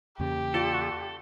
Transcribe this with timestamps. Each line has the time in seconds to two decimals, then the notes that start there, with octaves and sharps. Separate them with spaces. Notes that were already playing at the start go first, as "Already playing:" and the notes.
0.19 E2 C#3 A#3 G4
0.54 F4 A4 D5